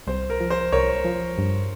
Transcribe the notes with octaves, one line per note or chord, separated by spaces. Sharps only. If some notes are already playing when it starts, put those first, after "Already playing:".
C2 C5
A#4
F3
C5
C2 A#4 C#5
F3
G2